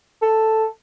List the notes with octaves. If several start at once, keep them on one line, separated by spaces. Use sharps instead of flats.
A4